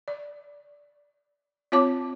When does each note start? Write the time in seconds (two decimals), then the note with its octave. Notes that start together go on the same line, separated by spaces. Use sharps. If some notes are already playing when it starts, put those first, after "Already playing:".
0.08 D5
1.72 C4 F4 C#5 A5 D6